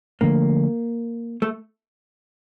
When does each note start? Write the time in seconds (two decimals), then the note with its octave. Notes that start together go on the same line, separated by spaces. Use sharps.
0.21 D3 F3 A3 A#3 D4
1.42 A3